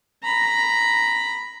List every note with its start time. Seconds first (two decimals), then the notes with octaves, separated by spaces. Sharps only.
0.23 A#5 B5